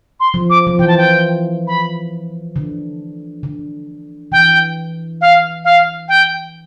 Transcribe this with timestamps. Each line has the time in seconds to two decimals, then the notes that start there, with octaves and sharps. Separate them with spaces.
0.20 C6
0.34 F3
0.50 D6
0.67 F3
0.79 E3 G5
0.88 A5
0.98 G5
1.68 B5
2.56 D3
3.43 D3
4.32 E3 G5
5.21 F5
5.65 F5
6.09 G5